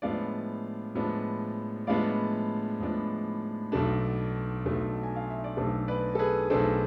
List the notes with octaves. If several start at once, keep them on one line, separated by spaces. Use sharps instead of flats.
A2 F3 G#3 B3 D4 D5 F5
A2 F3 G#3 B3 D4
A2 F3 G#3 B3 D4 D5 F5
A2 F3 G#3 B3 D4
B1 B2 A3 D4
B1 B2 A3 D4
G#5
F5
E5
D5
B1 B2 A3 D4 A4 C5
B4 D5
A4
G#4 B4
B1 B2 A3 D4 A4 C5